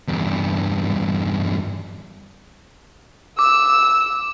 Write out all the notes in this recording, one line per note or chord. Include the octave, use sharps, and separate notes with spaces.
E2 G2
D6 E6